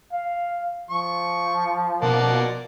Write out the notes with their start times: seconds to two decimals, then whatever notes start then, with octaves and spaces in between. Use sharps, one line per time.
0.12 F5
0.90 F3 C#6
2.02 B2 A#3 D5 F#5